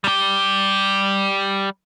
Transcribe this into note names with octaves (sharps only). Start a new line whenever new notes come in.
G3 G4